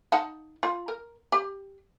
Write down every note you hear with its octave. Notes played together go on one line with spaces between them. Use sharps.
D#4 F#5 A5
F4
A#4
G4